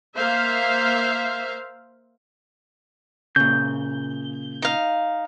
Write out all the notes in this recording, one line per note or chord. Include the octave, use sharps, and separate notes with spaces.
A#3 C5 E5 F5
A#2 C#3 G6
D#4 F5